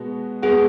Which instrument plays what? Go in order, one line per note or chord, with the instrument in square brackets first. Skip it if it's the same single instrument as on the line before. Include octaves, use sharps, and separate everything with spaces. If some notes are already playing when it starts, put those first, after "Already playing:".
Already playing: [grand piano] B2 G#3 B3 F#4
[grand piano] B2 G#3 B3 F#4 [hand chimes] G#4